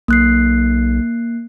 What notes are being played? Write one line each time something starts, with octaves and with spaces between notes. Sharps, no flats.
B1 A#3 F#6 C7